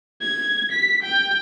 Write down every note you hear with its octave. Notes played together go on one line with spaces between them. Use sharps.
G#6
B6
G5